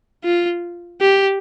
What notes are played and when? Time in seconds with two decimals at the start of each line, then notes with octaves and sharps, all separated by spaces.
0.24 F4
1.01 G4